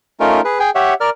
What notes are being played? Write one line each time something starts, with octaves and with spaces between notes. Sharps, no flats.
A3 C#4 D#4 F4 A#4
G#4 B4
G#4 G5 G#5
G4 C#5 E5 F#5
A#4 D5 F6